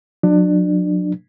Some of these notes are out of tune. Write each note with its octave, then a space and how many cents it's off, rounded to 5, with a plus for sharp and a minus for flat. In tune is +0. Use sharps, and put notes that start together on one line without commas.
F#3 -35 D4 +25